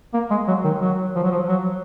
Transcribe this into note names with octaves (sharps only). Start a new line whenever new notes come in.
A#3
G#3
F#3
D#3
F#3
F3
F#3
F3
F#3